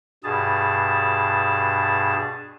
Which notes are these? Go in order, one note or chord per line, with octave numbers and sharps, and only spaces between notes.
G2 B2 G#4 A5